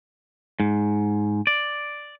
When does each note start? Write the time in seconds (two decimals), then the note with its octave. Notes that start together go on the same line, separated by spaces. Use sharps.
0.60 G#2
1.47 D5